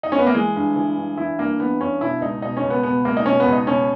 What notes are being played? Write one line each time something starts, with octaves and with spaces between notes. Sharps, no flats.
D#4
C#4
B3
A#3
E3 G#3
G2
E3
G2
E3 E4
G2 A#3
E3 B3
G2 C#4
B2 E4
C#2 D#4
B2 D#4
C#4
C#2
B3
B2 B3
C#2 A#3
D#4
B2 C#4
B3
C#2
D#4
B2 C#4